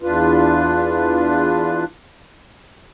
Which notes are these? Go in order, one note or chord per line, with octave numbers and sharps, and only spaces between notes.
E2 D4 F4 B4